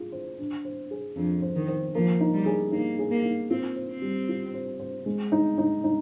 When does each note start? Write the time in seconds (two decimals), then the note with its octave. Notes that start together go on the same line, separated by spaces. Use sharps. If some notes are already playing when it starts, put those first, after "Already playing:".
Already playing: F4 G#4
0.12 C5
0.38 D4
0.65 C5
0.91 G#4
1.16 F2 D4
1.42 C5
1.56 D#3
1.68 C5
1.95 F3 A#3
2.20 D#4
2.33 G3
2.46 G#4
2.72 A#3 D#4
2.99 G#4
3.11 A#3
3.24 D#4
3.51 C4 F4
3.76 C5
3.89 C4
4.02 G3
4.29 F4
4.54 C5
4.80 C5
5.06 G#3
5.32 D#4
5.58 D#4
5.84 D#4